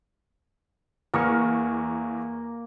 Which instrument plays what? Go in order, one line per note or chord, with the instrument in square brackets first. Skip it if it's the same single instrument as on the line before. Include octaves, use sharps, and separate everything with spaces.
[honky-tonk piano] E2 C#6 F6 [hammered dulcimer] A#3